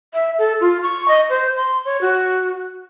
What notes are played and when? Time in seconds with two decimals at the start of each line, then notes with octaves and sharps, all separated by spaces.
0.14 E5
0.39 A4
0.61 F4
0.83 C#6
1.08 D#5
1.29 C5
1.56 C6
1.85 C#5
2.01 F#4